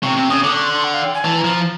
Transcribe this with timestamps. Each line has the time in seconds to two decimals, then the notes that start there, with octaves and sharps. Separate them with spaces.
0.03 C3 C#6
0.16 C3
0.30 C#3 D#6
0.44 D3 D6
0.54 C#6
0.64 C6
0.74 C6
0.84 F#5
0.94 F5
1.04 G5
1.14 G#5
1.24 E3 A5
1.39 A#5
1.44 F3